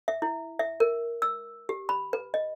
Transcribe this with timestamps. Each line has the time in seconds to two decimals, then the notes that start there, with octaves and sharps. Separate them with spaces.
0.08 E5
0.22 E4
0.59 E5
0.80 A#4
1.22 E6
1.69 G4
1.89 B5
2.13 B4
2.34 D#5